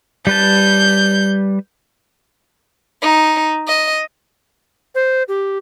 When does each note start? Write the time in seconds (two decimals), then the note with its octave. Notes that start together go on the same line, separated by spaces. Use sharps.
0.27 G3 B4 A5 G6
3.02 D#4
3.68 D#5
4.95 C5
5.28 G4